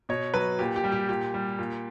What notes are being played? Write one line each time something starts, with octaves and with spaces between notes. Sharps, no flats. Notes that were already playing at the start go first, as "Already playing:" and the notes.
B2 C#5
F#3 B4
A#2 G4
G4
G3
G4
A#2 G4
G3
A#2